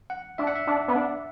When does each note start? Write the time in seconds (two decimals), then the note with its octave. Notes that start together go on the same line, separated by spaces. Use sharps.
0.10 F#5
0.38 D4 E5
0.47 F#5
0.55 E5
0.67 D4
0.88 B3
0.96 D4